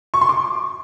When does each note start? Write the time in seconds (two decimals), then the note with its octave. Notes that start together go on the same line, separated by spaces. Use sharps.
0.14 C#6
0.21 C6
0.29 D6